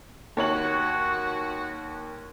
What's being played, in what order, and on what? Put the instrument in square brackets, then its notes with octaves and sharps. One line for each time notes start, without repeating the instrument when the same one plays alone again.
[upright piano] D#2 C#5 F#7 [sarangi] F#4